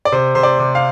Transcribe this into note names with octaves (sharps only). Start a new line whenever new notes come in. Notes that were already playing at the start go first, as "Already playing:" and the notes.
D5
C3 C5
C3 C5
D5
C3
F5